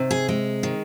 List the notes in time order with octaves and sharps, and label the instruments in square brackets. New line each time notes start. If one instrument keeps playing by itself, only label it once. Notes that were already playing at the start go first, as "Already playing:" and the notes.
Already playing: [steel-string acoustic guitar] C3 D#3
G#4
G#3
D#3